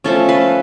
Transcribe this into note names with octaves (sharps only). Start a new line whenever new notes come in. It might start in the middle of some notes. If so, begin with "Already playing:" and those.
F3 A3 C#4 A4
B4